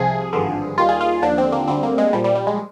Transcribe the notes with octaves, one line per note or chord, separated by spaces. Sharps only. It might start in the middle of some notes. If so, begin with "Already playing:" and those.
Already playing: C2 C3 F3 G#4
G#1 G2 D3 F3
D#2 D#3 G3 F4
G#4
F4
D#2 D3 F3 D4
C4
A#3
D2 D3 G3 C4
A#3
G#3
A#1 A#2 F3 G3
G3
G3
G#3